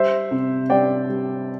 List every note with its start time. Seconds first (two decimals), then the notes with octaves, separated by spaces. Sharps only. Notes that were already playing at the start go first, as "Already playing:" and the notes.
Already playing: G3 C5 E5
0.31 C3
0.70 G3 D5 G5
1.09 G3